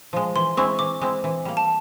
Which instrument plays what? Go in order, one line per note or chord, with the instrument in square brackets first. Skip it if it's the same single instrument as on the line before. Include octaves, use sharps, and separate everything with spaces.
[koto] F3 G#3
[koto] E3 [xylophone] C6
[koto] G#3 C4 E4 [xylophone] C#6
[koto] E3 [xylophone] D6
[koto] G#3 C4 E4
E3
G3 A#3
[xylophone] A5